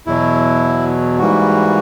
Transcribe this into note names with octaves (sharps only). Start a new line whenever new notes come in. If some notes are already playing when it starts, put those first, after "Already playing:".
E2 B2 F#3 E4
G#2 E3 G3 A#3 F#4